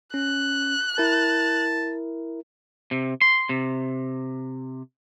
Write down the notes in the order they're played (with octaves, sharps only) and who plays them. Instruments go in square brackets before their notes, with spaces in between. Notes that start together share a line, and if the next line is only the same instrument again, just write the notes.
[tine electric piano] C#4 [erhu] F#6
[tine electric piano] E4 A#4 [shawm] A5
[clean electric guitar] C3
C6
C3